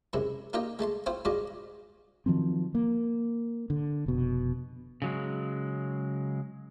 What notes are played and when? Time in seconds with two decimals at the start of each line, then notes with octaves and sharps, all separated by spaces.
0.13 F#2 C3 G#3 E4
0.53 A#3 D#4 F4 G4 D#5 G5
0.79 G#3 A3 A5 C6
1.06 C4 E4 F4 C5
1.25 G2 G#3 F4 F#4 D5 D#5
2.26 D#3 F3 F#3 C4
2.75 A#3
3.70 D3
4.06 F1 B2
5.02 C#3 F#3 G#3